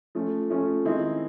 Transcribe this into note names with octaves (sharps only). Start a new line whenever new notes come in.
F3 A3 C#4
F3 A3 C#4
D#3 G#3 C4 E4